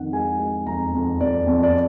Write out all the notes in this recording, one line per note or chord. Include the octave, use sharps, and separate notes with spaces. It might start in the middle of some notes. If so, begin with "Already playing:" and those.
Already playing: F2 D#3 F#5
G#3 G#5
G#3
F2 A#5
F2
F2 D5
F2
D5